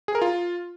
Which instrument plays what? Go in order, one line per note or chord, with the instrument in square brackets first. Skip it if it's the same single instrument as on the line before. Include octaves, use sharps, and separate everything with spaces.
[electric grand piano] G#4
A#4
F4